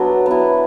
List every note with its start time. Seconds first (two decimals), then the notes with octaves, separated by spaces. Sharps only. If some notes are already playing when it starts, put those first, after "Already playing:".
Already playing: F#3 B3 D4 E5
0.26 B3 E4